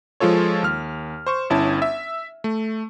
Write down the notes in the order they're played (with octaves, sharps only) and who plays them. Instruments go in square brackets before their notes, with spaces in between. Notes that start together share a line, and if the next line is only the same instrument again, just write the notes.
[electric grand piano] F3 G#3 F4 A4 C#5
D#2 F6
C5 C#6 E7
G1 C#4 E4 A5
E5
A3